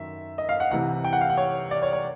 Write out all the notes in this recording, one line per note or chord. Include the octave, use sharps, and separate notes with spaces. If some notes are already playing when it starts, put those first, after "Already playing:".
Already playing: F#2 D#3 E5
D#5
F5
F#5
C2 C3 E3 F#5
G5
F#5
F5
F#5
C#5
D5
C#5
C#5